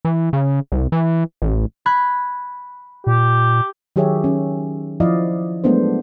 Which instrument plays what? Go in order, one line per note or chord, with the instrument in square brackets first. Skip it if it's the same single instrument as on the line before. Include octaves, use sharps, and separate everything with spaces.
[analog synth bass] E3
C#3
C2
E3
A1
[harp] B5 F#6 G#6
[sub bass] A#2 [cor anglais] G4
[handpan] D#3 F#3 G4 G#4 C#5 E5
C#4
F3 E4 D5 D#5 F5
F#3 G#3 A3 B3 D4 C5